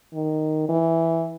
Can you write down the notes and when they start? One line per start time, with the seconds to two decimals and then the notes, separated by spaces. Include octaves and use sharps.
0.13 D#3
0.69 E3